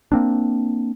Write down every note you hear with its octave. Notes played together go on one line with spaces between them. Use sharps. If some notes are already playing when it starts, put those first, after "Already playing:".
A#3 C4 D4